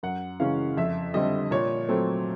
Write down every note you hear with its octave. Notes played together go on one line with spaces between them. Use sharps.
F#2 F#5
C#3 E3 G#3 C#4 F5
F2 E5
D3 G3 C4 D#5
A#2 C#5
F#3 A3 C4